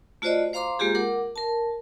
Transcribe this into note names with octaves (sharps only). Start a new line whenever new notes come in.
A3 F4 F#4 C5 D5 D#5
C5 F5 A#5 C6 D6
G#3 A#3 F4 G4 G#4
A#4 F#5 D6
A#4 A5